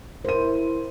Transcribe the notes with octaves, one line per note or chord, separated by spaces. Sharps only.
E4 A#4 C5 D#7